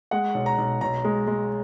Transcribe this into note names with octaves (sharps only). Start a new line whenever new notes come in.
G#3 F#5
B1
A#5
B1
B1 A#5
G#3
G#3